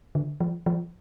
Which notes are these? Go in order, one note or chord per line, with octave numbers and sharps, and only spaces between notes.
D3
F3
F3